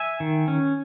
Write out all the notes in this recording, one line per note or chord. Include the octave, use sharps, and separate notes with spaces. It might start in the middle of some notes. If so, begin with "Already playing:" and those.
Already playing: E5 G#5
D#3
C#4